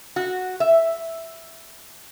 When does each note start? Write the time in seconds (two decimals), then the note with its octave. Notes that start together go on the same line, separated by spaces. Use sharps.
0.16 F#4
0.60 E5